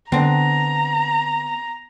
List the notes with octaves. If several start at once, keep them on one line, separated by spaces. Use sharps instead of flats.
D3 B3 C4 D4 A#5